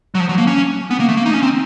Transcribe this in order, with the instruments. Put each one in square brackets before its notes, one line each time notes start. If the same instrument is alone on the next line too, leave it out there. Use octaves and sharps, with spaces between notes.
[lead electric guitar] F#3
F3
F#3
A#3
C#4
B3
A#3
A3
A#3
D#4
C#4
C4